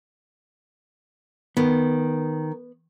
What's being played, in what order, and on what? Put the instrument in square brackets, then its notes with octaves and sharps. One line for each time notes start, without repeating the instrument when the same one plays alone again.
[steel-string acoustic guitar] D#3 [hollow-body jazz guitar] B3